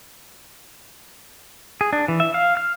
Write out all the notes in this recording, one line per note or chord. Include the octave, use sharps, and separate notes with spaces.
G#4
D4
E3
E5
F5
F6